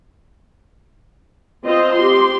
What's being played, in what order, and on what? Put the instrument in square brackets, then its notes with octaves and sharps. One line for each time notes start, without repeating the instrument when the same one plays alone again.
[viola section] C4 F4 C5 D#5
G4 C6